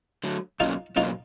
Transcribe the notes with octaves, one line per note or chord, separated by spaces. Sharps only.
D3 F#3 A3
B2 F#3 A#3 C#4 D#4 F4
B2 F#3 A#3 C#4 D#4 F4